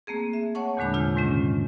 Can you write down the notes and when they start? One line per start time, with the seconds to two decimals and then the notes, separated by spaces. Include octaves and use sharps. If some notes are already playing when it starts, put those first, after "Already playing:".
0.07 A3 A#3 C4 G#4
0.33 E5
0.55 C#5 F#5 A5 C#6
0.77 E2 A#2 D3 G#3 D4 B5
0.94 C3 F4 F6 G6
1.16 G#2 D#3 G#3 A3 C#4 F4